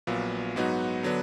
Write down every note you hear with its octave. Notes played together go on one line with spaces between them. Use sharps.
A#1 A#2 F#3 B3 F4
G#2 F#3 B3 D#4 F#4
D3 F#3 B3 D4